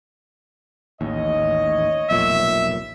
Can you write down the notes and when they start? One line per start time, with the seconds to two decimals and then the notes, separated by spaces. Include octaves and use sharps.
1.01 A1 D#2 C#5 D#5
2.11 F1 B1 A#2 E5